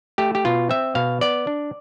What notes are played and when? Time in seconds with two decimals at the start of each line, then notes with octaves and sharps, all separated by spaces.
0.18 A3 G4
0.35 G4
0.45 B2 F4
0.69 C4 E5
0.95 B2 F5
1.21 B3 D5
1.47 D4